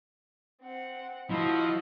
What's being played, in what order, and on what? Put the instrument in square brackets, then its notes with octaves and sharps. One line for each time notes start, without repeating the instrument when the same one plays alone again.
[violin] C4 F#5
[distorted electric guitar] F3 [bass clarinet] E4 [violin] F#4 D#5